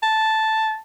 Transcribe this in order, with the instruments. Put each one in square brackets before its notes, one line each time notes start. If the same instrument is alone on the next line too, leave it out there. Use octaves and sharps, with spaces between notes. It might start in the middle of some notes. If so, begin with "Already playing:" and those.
[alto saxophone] A5